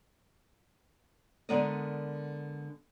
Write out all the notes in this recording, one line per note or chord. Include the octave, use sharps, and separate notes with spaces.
D3 G#3 B3 A#4 D5 D#5